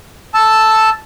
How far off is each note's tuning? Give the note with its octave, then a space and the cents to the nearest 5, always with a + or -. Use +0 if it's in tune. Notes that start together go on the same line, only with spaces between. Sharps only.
A5 +0 E6 +0